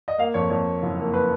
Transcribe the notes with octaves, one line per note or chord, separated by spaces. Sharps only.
D#5
A#3 F5
F2 C#5
F2 C#5
A#3
F#1
A#3
B4